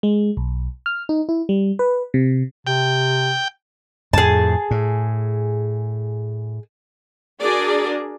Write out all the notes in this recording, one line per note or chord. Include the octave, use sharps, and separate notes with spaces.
G#3
B1
F6
D#4
E4
G3
B4
C3
C3 G5
F2 A2 G#4 A5
A2
D4 F#4 G#4 A#4 D5